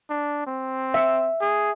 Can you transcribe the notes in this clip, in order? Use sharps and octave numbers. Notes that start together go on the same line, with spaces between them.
D4
C4
E5 C#7
G#4